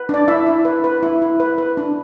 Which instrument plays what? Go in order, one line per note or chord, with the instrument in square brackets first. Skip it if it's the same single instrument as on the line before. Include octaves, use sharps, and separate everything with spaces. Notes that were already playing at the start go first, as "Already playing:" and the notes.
Already playing: [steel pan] B4
D4 D5
E4 E5
E4
B4
B4
E4
E4
B4
B4
D4